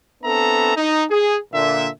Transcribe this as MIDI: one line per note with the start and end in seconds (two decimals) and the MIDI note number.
0.24 0.73 59
0.24 0.73 60
0.24 0.73 62
0.24 0.73 69
0.24 0.73 76
0.24 0.73 82
0.76 1.04 63
1.10 1.37 68
1.53 1.88 46
1.53 1.88 50
1.53 1.88 76